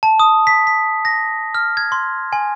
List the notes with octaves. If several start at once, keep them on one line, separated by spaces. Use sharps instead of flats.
A5
D#6
B6
B6
A#6
F6
G#6
C6
G#5